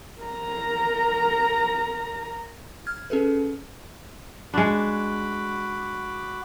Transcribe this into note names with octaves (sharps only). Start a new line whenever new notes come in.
A#4 A#5
F6 G#6
C#4 G#4 A4 B4
G#3 D4 F#4 B5 D6